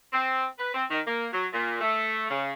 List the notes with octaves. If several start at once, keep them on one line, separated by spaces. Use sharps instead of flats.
C4
B4
C4
D#3
A#3
F#3
A#2
A3
C#3